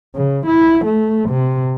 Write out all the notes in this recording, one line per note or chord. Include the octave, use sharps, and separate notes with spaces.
C#3
E4
A3
C3